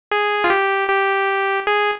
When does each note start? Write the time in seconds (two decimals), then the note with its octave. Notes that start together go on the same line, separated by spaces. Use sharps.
0.11 G#4
0.44 F4
0.50 G4
0.88 G4
1.67 G#4